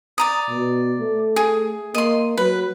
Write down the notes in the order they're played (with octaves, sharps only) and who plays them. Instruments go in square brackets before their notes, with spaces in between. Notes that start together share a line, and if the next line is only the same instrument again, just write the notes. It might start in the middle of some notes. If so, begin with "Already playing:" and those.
[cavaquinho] D5 A#5 D#6
[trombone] B2
A3
[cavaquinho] G#4
[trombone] A#3 [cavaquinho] D#5 C6
[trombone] F#3 [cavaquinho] B4